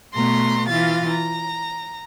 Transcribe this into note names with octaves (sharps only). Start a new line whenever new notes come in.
B2 A3 B3 A#5 C6
E3 F4 F5 A6
A#5